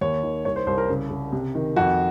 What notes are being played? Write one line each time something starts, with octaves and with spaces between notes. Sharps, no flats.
D#2 C#5
D#3
C2 C#5
C5
C2 C5
A#4
C#3
C#3
C3
D#3
F2 F#4